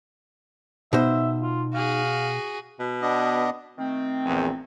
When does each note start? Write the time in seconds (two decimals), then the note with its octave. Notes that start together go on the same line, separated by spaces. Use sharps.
0.93 B2 D#4 C5 E5
1.42 F4
1.74 F#4 G#4 F5
2.79 B2
3.02 B3 D4 D#5
3.78 D#3 A3 C4
4.26 A#1 E2